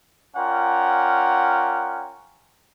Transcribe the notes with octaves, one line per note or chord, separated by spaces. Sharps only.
C#4 F4 A#4 D5 F#5 G5